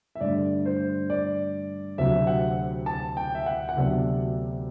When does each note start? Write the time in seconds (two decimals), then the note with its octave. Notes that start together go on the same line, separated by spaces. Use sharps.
0.15 E5
0.21 G2 D3 A3 D5
0.65 C5
1.10 D5
1.98 D2 C3 F#3 C4 E5
2.27 F#5
2.86 A5
3.17 G5
3.35 E5
3.46 F#5
3.69 F#5
3.75 D2 C3 F#3 B3 D4 E5